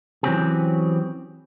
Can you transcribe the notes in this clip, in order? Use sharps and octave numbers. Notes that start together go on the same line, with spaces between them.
E3 F#3 C4 C#4 G4 G#4